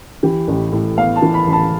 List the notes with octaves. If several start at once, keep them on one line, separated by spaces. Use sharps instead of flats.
E3 G4
A1
A2
B3 F5
A5
E3
B5
A1 B5
A5